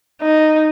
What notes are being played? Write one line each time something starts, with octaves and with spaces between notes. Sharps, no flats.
D#4